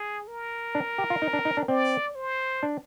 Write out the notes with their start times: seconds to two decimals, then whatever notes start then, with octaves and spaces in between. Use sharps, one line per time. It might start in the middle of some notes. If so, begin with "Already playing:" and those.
Already playing: G#4
0.27 A#4
0.75 D4
0.98 G4
1.10 F4
1.22 D#4
1.33 D4
1.45 D#4
1.57 D4
1.68 C4 D5
2.15 C5
2.63 D4